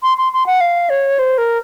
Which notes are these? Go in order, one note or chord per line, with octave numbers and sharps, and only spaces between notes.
C6
C6
C6
F#5
F5
C#5
C5
A#4